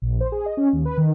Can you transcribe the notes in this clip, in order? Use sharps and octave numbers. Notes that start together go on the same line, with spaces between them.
A#1
C5
G#4
D#5
C#4
D#2
B4
D#3